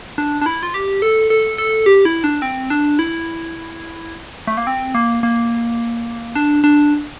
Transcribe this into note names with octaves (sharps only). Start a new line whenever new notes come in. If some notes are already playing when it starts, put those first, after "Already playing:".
D4
D4
E4
F4
G4
A4
A4
A4
G4
E4
D4
C4
D4
E4
A3
A#3
C4
A#3
A#3
D4
D4